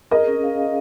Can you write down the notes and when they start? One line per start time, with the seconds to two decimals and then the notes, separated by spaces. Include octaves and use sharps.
0.11 G#4 A#4 D#5
0.27 C#4
0.43 F5
0.58 F5